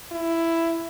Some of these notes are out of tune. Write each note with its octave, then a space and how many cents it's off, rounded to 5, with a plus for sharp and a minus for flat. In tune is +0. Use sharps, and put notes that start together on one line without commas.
E4 +10